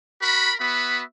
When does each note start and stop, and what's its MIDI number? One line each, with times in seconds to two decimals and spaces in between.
0.21 0.53 66
0.21 0.53 70
0.21 0.53 83
0.59 1.01 59
0.59 1.01 66
0.59 1.01 76
0.59 1.01 83